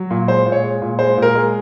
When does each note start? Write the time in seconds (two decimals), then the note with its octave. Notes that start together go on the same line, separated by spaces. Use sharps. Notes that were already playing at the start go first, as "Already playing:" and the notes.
Already playing: F#3
0.11 A#2
0.28 G#3 C5
0.46 A#2
0.52 C#5
0.63 G#3
0.82 A#2
0.99 G#3 C5
1.17 A#2
1.22 A#4
1.35 G#3